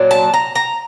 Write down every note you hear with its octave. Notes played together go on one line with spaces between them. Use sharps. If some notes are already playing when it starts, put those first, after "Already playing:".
Already playing: A#2 F#3 D4
A5
A#5
A#5